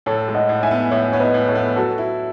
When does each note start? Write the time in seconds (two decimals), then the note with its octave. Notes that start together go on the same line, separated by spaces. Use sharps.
0.06 A2 A4 C#5
0.28 G#3
0.35 D#5 F#5
0.49 A2
0.63 E5 G#5
0.71 B3
0.91 A2 C#5 E5
1.13 B3 C#5
1.20 B4 D#5
1.34 A2
1.48 A4 C#5
1.55 B3
1.76 F#3 F#4 A4
1.98 E4